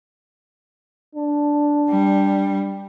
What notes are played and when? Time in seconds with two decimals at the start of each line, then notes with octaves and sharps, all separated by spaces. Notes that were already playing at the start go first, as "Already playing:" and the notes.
1.15 D4
1.90 G3